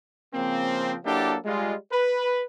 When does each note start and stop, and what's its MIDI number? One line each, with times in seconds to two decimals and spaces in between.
0.34 0.95 49
0.34 0.95 53
0.34 0.95 58
0.34 0.95 60
1.06 1.36 54
1.06 1.36 58
1.06 1.36 62
1.06 1.36 64
1.06 1.36 67
1.06 1.36 69
1.45 1.74 55
1.45 1.74 56
1.45 1.74 65
1.92 2.43 71